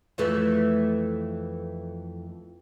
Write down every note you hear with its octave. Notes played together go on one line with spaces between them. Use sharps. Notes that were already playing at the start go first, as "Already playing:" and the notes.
F2 E3 A3